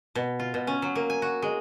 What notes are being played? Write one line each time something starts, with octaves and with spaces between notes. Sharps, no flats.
B2
F4
B2
C#4
F#3
A#3
G#5
F#4
G#3